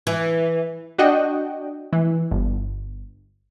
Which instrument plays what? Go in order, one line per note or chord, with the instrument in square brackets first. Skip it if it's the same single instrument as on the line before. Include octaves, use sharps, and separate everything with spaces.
[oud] E3
[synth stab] D4 F#4 D#5 F#5 G5
E3
G1